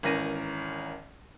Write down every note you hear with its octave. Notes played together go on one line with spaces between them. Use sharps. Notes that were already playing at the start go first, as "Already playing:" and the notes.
G#1 E3 C#4 A#4 A#6 D#7